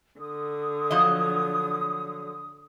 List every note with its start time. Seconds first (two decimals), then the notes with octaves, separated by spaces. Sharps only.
0.20 D3 D#6
0.91 F3 F#3 D#5